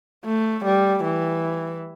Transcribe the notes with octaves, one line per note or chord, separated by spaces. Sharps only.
A3
G3
E3